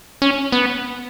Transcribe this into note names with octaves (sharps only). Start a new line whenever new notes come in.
C#4
B3